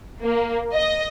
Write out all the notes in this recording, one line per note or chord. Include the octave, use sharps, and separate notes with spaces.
A#3
D#5